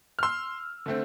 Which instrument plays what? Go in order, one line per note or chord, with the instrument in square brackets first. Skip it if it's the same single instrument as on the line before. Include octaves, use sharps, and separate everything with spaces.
[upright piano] F6
C6 E6
D3 A3 C4